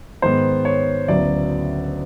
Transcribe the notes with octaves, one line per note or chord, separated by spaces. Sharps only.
G#2 D#3 G#3 B3 C5
C#5
D2 C#3 F#3 B3 E4 D5